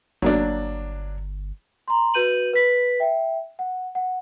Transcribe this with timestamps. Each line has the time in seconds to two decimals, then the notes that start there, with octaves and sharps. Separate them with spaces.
0.22 G1 F#3 A#3 D4
1.88 A#5 C6
2.14 F#4 B4 G6 D#7 F#7
2.53 B4 B6
3.00 E5 G5
3.59 F#5
3.95 F#5